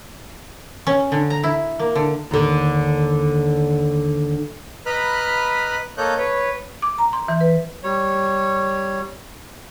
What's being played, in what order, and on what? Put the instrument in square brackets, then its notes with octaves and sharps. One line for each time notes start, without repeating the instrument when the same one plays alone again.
[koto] C#4
D3
A#5
E4
A#3
D3
[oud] D#2 D3
[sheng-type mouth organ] B4 D#5 A#5 B5 F6 F#6
A#3 A4 C#5 D#5 F#6 G6
B4 C#5
[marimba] D6
A#5
C6
E3
B4
[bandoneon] G3 C#5